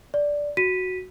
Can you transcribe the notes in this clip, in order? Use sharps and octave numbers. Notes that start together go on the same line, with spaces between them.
D5
F#4 B6 D#7